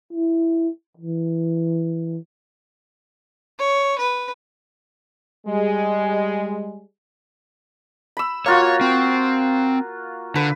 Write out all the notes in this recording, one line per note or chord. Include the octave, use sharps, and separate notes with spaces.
E4
E3
C#5
B4
G3 G#3
B5 E6
A#3 F4 F#4 C#5
C4
D3 B4